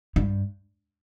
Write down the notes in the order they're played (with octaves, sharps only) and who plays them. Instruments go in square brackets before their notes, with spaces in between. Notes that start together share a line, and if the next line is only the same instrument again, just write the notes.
[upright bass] G2